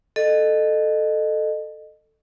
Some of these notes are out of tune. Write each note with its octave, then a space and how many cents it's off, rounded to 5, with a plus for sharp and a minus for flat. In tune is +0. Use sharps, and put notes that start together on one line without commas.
A4 +0 D#5 -25